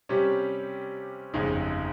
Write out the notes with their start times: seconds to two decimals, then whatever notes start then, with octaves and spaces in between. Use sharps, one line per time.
0.09 C3 G3 C#4 G4
1.34 G1 F2 C#3 G#3 D#4